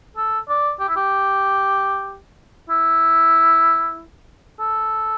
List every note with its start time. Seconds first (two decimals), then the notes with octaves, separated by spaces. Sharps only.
0.17 A4
0.49 D5
0.80 G4
0.88 E4
0.96 G4
2.70 E4
4.59 A4